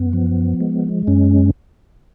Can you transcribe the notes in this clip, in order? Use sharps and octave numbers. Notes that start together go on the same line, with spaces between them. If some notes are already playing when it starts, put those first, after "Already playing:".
Already playing: F#2 B3
F3
G#3
F#2 C#4